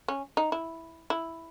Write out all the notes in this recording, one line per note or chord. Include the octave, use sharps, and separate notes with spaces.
C#4
D#4
E4
E4